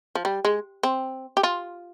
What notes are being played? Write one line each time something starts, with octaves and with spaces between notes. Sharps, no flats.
F3
G3
G#3
C4
G4
F4